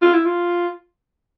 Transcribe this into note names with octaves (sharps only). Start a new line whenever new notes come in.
F4
E4
F4